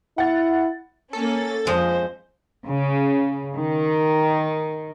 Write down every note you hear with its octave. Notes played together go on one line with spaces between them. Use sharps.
E4 F#5 A6
A#3 C#4 A4
F2 F3 G#3 C5 D#5
C#3
D#3